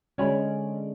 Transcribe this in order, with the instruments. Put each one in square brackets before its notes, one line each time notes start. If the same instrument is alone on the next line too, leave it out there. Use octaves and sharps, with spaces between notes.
[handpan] D3 G#3 [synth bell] C#4 D5 [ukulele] C#5 G#5 B5